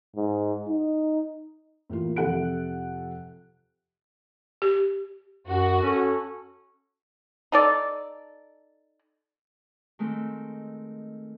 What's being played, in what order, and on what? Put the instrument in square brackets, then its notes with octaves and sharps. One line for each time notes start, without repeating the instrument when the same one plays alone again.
[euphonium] G#2
D#4
[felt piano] A2 E3 A#3 F4
F2 C3 A4 F#5 F#6 D7
[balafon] G4
[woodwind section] F#2 [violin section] F#4
[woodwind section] C#4 A4
[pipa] D#4 A4 D5
[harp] D#3 G#3 A3 C4